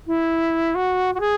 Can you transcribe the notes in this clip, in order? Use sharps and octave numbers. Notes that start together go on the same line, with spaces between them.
E4
F#4
F#4
G#4